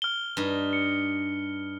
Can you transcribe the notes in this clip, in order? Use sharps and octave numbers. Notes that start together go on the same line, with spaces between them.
F6 G7
G2 D#4
C#7